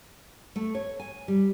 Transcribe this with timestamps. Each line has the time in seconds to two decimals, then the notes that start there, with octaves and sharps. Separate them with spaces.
0.56 A3
0.75 C#5
0.99 G#5
1.28 G3